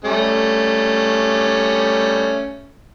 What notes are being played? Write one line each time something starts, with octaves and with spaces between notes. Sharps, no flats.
G3 A3 C#4